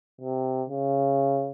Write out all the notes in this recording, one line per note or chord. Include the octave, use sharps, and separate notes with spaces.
C3
C#3